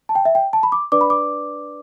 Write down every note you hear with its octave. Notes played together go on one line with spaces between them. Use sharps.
A5
G5
E5
G5
A5
B5
D6
D4 B4 D5 D6
B5
D6